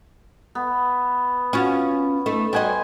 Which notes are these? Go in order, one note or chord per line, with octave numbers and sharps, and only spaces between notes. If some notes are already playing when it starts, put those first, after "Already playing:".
B3
C#4 F4 F#4
A3 D#4
G3 F#4 C5 D#5 G#5 C6